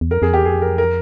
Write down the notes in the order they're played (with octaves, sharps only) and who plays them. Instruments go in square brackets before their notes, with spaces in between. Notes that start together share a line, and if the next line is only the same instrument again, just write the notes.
[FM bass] E2
[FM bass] F2 [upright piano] A#4
[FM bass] F2 [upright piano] G#4
[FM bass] E2 [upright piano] G4
[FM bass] F2 [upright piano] G#4
[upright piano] A#4
A#4